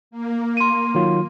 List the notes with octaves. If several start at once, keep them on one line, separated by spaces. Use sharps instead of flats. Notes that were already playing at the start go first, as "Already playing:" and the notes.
A#3
C6 D#7
D#3 F#3 F4